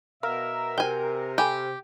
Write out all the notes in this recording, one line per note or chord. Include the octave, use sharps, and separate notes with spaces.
B2 A#4 E5 F5
C3 F#4 G5 G#5
G4 A4 G#5 B5